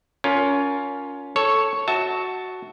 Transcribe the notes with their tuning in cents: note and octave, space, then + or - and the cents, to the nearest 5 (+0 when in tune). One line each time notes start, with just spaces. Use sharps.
C#4 +20 F4 +20 A#4 +0
A4 +0 C#5 +0
F#4 +0 E5 -30 A5 +0